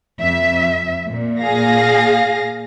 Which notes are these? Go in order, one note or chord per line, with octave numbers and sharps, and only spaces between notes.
F2 E5
A#2
G#4 F5 A#6